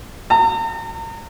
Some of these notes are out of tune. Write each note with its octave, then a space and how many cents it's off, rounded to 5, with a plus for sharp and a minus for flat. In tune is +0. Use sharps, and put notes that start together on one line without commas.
A#5 -40